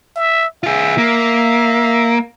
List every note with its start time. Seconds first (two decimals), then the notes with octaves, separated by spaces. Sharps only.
0.16 E5
0.63 F4 G#4 E5
0.98 A#3